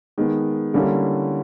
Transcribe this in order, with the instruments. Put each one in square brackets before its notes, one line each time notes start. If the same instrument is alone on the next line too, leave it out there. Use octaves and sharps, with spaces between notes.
[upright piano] D#3 G#3 B3
D3 G3 A#3 C#4 E4